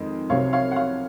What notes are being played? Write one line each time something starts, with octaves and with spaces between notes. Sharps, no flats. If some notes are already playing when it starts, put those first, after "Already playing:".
Already playing: F2 D#3 G#3 D#5
C2 C3 F#3 C4 C#5 F5
C#5 F5
F#5
C#5 F5